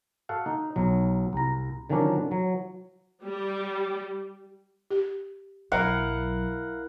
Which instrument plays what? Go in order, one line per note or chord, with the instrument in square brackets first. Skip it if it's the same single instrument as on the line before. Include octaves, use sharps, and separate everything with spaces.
[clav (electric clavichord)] F#4 A4 F5 F#5
D#4
B1 F#3
C2 A#5
D3 D#3 F3 F#3 C#4 D4
F#3
[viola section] G3
[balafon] G4
[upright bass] B1 F#3 [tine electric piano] E4 A#4 F5 [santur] F#5